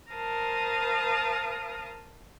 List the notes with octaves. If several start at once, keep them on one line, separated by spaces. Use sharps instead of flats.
A#4 C5 F5 A5 D#6